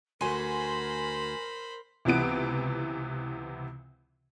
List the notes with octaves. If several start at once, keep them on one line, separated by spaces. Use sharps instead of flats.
D2 F#4 A#4 C5 G#5 B5 C6 D#7
C#2 C3 E3 B3 D7